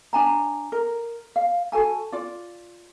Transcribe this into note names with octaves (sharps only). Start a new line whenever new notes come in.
D4 G#5 A#5
A#4
F5
F#4 A4 G#5 A5
F4 D5